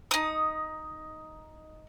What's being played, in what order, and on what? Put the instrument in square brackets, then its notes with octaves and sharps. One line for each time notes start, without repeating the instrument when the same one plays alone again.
[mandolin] D#4 D#6